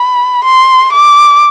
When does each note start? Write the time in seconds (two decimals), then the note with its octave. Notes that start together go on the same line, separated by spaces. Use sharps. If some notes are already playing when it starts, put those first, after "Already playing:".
Already playing: B5
0.44 C6
0.92 D6